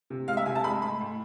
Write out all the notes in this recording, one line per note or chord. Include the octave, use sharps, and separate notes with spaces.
C3
G#3 F5
E5
C3 G#5
A5
G#3 B5
A2 B5
A2